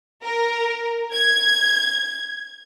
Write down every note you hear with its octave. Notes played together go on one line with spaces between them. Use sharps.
A#4
G#6